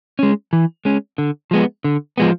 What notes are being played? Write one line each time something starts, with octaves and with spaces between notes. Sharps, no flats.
G#3 C#4
E3
G#3 C#4
D3
F3 G#3 B3
D3
F3 G#3 B3